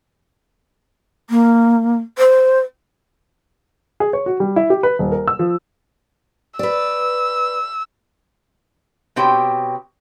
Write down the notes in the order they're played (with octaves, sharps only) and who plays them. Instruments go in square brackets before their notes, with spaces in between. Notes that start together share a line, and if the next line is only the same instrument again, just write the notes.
[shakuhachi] A#3
C5
[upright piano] G#4
C#5
F#4
G3
E4
G4
B4
D#1
A#4
E6
F3
[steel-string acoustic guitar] B4 D5 [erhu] E6
[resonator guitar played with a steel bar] B2 C4 G4 C#5 G5